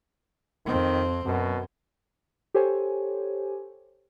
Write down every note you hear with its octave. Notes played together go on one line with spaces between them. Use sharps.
F2 D#3 C4
F#2 B2
G4 A4 C5 C#5 G#5